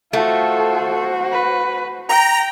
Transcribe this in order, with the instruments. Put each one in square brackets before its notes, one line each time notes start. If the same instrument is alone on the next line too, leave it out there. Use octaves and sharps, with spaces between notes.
[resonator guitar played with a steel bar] A3 [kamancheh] F4 A4 [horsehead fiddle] F#4 C5
[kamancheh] B4
[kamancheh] G5 [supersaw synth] A#5